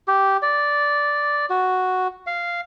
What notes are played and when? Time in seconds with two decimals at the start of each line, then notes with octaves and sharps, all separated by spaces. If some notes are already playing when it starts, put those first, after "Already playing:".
0.08 G4
0.42 D5
1.50 F#4
2.27 F5